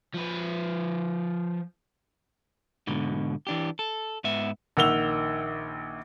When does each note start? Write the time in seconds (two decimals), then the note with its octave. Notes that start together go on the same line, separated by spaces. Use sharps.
0.14 F3 B4
2.87 G#2 B2 D3
3.47 E3 D4 G4
3.79 A4
4.24 G#2 B3 E5
4.77 A#1 D#3 F#5 E6 F7 G7